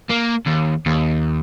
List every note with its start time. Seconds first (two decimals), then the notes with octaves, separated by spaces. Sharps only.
0.10 A#3
0.47 D#2
0.86 D#2